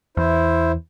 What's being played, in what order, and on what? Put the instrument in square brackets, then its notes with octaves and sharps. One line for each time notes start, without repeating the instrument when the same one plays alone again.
[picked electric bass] E2 [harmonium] E4 C5